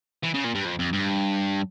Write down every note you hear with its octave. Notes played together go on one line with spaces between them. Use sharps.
E3
C#3
A#2
G2
F2
F2
G2